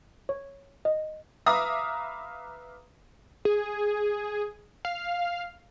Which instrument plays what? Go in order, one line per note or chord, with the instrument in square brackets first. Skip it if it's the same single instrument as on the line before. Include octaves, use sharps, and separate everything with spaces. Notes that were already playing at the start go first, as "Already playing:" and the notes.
[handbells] C#5
D#5
[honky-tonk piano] B4 E5 F5 A#5 D6 D#6
[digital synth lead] G#4
F5